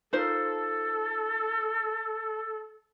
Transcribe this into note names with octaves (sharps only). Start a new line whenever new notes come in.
D#4 F4 A4 C5